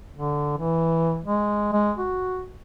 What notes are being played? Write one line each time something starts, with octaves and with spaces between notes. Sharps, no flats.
D3
E3
G#3
G#3
F#4